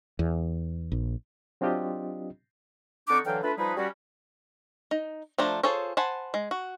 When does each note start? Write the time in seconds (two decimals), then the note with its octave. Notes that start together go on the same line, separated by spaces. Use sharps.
0.19 E2
0.92 A#1
1.61 F#3 C4 D4 F4 G4 D#5
3.09 D3 C4 D4 D#4 C#6 D6
3.26 D3 E3 F#3 F5 G5
3.43 A3 D4 F4 B4
3.58 F3 G3 D#4 G#4 B4
3.76 G3 C#4 F#4
4.91 D#4
5.38 F3 A3 D4 C5 A#5
5.63 F4 G#4 A4 C5 C#5
5.97 C5 F#5 G#5 A5 B5
6.34 G#3
6.51 F#4